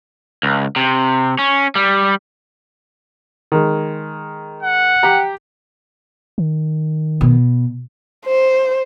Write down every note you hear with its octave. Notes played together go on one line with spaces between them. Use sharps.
C#2
C3
C#4
G3
D#3 G#3
F#5
G4 G5 A#5
D#3
B2
C5